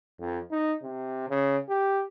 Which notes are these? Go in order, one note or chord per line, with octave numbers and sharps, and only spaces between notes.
F2
D#4
C3
C#3
G4